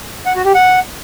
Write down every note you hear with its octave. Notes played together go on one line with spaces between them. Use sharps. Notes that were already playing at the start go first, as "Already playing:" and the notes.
F#5
F#4
G4
F#5